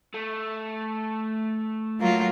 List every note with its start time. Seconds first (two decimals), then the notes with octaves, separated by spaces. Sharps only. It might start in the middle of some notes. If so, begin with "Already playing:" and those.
0.14 A3
1.99 F#3 A#3 F4